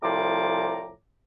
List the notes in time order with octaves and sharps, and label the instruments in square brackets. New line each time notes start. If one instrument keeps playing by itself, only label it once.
[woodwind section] C2 A2 F3 A#5 D6